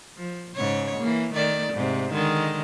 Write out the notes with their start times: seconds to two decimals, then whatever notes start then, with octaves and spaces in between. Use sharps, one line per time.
0.18 F3
0.56 G#2 C#3 C#5
0.99 E3 A#3
1.34 D#3 A3 D5
1.73 G#2 C3
2.13 D3 D#3 G#3